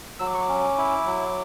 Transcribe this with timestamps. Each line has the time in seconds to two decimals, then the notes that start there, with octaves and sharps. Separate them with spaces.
0.19 F#3 E6
0.27 D6
0.34 C#6
0.41 D6
0.49 C#4
0.78 E4
1.06 F#3